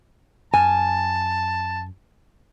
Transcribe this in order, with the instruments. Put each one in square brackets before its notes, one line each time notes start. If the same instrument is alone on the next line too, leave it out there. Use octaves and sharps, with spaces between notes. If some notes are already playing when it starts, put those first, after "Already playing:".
[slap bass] F#2 [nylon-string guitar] G#5 [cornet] A5